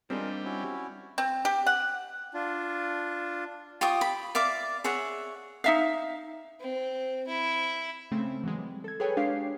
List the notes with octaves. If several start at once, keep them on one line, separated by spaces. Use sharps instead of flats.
G3 G#3 C4 D4 D#4 F4 A#4
A#3
C#4 E4 F#4
C4
G4
F#5
D4 F4
F4 G4 C#6 D#6
B5
D5 E5 F5 D6
G#4 C#5 E5 F#5
D#4 E5 F5
C4
E4
C#3 A3 C4
E3 F#3 G#3
G3
A4 G#6
G#4 A4 B4 C#5 G5 G#5
G#3 D4 G4 C#5 F5 C7